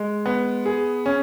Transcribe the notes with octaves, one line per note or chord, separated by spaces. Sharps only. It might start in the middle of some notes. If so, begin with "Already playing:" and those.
Already playing: G#3
B3
G#4
C#4